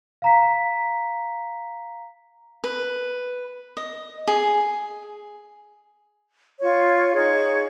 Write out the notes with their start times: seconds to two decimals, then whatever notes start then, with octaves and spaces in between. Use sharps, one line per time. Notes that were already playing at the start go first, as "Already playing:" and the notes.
0.22 F5 A#5 B6
2.64 B4
3.77 D#5
4.27 G#4
6.60 F4 C#5 C#6
7.13 D#4 G#4 C#5 C#6